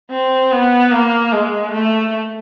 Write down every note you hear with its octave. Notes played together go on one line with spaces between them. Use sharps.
C4
B3
A#3
G#3
A3